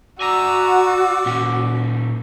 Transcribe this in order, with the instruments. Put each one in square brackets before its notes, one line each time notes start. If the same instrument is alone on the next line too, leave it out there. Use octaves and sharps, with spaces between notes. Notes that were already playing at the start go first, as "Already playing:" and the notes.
[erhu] F#4 [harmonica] D5 E6 [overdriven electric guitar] G#5 A#5
[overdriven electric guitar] A#2 C#4